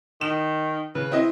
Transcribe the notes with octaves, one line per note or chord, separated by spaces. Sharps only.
D#3 E7
C#3 B4
C4 E4 D#5